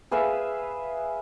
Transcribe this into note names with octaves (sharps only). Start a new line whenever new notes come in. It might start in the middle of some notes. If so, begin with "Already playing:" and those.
G#4 B4 E5 F5